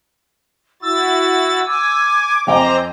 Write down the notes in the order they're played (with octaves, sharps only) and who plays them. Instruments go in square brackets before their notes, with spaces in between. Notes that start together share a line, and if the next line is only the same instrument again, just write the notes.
[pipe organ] E4 F#4 A6 [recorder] E6
[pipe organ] G#5 [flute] D6
[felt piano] F2 G5 G#5 [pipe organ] C4 C5 A#5 [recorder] D#5